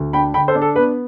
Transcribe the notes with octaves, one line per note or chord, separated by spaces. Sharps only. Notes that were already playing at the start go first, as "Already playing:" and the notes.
Already playing: D2
D4 G5 B5
D3 G5 B5
A4 C5
D4
A4
B3 B4